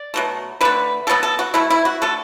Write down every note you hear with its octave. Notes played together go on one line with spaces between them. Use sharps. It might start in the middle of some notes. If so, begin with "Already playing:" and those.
Already playing: D5
B2 F#3 A3
D3 A3 B4
B2 F#3 B3 A4
A4
F#4
B2 A3 E4
E4
F#4
D3 A3 A4